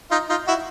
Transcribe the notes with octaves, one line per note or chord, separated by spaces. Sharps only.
D#4 F4
D#4 F4
E4 F#4